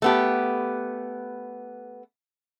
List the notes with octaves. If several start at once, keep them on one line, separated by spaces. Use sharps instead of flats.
A3 B3 G4